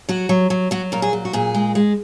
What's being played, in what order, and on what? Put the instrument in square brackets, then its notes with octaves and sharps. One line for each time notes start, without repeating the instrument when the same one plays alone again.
[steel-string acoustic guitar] F#3 F#4
F#3
F#3
F#3 F#4
A#2 A#4
G#4
F#3
F#4
A#2 G#4
G#3
G#3